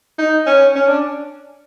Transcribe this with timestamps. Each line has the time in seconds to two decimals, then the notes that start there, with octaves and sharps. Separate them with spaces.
0.18 D#4
0.47 C#4
0.75 C#4
0.88 D4